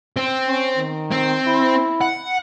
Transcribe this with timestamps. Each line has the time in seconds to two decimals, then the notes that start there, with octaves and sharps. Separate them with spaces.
0.16 C4
0.46 C#4
0.76 D#3
1.11 C4
1.47 E4
2.01 F#5